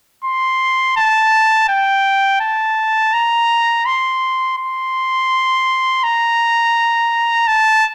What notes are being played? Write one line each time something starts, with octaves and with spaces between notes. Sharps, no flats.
C6
A5
G5
A5
A#5
C6
C6
A#5
A5